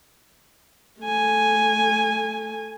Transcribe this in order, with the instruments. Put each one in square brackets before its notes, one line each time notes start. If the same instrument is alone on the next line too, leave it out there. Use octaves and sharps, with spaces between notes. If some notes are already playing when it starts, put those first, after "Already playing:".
[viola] A3 G#5